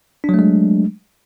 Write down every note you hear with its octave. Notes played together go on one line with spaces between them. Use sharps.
F#3 G#3 A3 D4